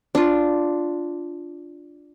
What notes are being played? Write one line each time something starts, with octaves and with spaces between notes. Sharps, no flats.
D4 F4